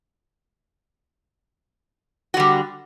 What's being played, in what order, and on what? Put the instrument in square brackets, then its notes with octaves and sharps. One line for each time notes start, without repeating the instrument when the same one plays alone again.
[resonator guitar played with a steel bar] F#4
D3
G3